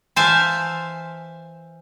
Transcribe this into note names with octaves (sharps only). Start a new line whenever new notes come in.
E3 C5 E5 F5 G#5 A5